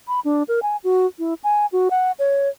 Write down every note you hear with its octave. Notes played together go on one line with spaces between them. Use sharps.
B5
D4
A#4
G#5
F#4
E4
G#5
F#4
F#5
C#5